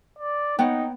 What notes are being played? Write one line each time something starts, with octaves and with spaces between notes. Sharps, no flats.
D5
B3 D#4 C#5 F#5 G5